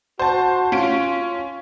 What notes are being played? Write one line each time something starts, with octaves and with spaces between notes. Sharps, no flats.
F#4 C5 A5
C#4 F4 D7